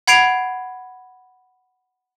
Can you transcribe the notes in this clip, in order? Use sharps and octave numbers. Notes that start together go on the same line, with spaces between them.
F#5 B5 G#6 C7 D7 F7